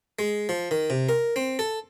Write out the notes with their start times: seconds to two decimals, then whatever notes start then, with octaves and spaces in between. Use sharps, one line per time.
0.19 G#3
0.49 F3
0.71 D#3
0.90 C3
1.09 A#4
1.36 C4
1.59 A4